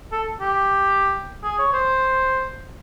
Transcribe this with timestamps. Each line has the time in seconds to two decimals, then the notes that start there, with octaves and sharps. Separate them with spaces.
0.12 A4
0.41 G4
1.44 G#4
1.59 C#5
1.74 C5